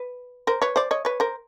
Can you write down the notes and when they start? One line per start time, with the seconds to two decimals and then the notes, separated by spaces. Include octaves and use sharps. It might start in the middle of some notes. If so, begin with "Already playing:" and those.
Already playing: B4
0.47 A#4 C5
0.62 B4 C#5
0.76 C5 D5
0.91 C#5 D#5
1.05 B4 C#5
1.20 A#4 C5